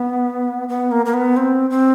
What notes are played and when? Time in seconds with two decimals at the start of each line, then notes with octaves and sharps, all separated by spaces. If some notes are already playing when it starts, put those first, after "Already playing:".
Already playing: B3
0.69 B3
0.91 A#3
1.06 A#3
1.14 B3
1.37 C4
1.70 C4